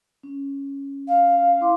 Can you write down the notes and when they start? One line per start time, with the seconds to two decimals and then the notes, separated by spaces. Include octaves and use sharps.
0.23 C#4
1.07 F5
1.61 E4 C6 D6